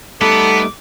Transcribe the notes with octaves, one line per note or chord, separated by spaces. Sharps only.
G3 A3 B3 D#4 A4 D6